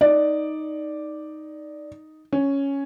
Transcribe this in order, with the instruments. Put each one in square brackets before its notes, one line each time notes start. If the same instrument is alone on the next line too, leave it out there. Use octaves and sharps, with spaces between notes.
[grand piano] D#4 [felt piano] D5
[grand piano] C#4